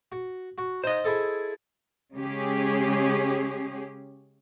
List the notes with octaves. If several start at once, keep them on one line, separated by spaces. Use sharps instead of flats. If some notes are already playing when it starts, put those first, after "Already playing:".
F#4
F#4
D#4 C5 D#5
E4 G#4 A4
C#3 G#3 C#4 G4 G#4